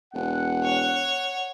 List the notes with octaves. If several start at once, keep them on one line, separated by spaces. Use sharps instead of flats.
E1 F#5
C#5